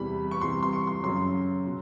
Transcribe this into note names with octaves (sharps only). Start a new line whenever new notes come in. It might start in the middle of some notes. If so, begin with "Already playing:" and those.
Already playing: E2 C3 E3 G3 B5
C#6
C2 C3 E3 G3 C6
C6
C#6
C6
F#2 C#3 F#3 C6
B2